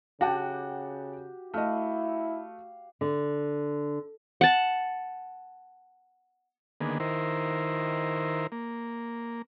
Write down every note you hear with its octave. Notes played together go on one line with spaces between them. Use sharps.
C#3 F#4 G4 F#5 G5 A5
A3 E4 D#5 F5
D3
F#5 A5
D3 D#3 A#3 B3 G#4
D#3 E4 A#4 C5
A#3